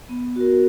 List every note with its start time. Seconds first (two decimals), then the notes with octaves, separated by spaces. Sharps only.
0.09 B3
0.36 F#4 A#4